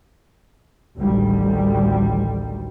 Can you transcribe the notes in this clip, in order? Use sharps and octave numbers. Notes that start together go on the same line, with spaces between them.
A1 D2 D#3 G3